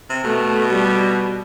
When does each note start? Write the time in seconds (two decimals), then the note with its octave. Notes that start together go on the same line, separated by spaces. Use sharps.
0.10 C3
0.24 B2 A3
0.71 G3